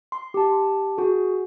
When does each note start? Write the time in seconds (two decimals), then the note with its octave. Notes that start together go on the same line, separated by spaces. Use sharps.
0.12 C6
0.34 G4 A5
0.98 F#4 G#4